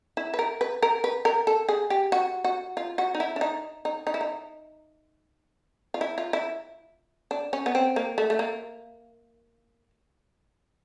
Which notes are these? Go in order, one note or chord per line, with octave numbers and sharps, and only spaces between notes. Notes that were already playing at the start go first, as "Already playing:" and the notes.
E4
B4
A#4
B4
A#4
B4
A#4
A4
G#4
G4
F#4
F#4
F4
F#4
D#4
E4
D4
D#4
D#4
D#4
E4
D#4
F4
E4
F4
E4
D4
C#4
B3
C4
A#3
A3
A3
A#3